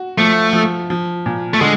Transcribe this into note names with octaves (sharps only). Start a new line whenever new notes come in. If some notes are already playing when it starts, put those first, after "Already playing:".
Already playing: F#4
F3 A3
F3
F3
A#2
A3
D3 G#3